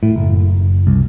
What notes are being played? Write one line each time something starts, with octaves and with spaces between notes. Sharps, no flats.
A2
F#1
C2